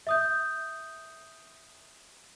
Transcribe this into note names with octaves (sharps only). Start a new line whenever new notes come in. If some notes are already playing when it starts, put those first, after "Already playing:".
E5 D#6 G6